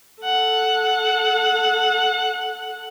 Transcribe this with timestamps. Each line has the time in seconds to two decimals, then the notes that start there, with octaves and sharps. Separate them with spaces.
0.23 A4 F#5